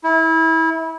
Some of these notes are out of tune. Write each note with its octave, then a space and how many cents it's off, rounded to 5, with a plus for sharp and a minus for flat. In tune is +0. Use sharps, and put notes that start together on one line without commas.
E4 -25